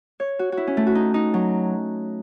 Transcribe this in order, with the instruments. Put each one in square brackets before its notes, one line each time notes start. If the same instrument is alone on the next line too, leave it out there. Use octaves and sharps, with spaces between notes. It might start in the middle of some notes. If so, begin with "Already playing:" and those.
[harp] C#5
F#4
F#4
E4
C#4
A3
F#4
D#4
D#4
F#3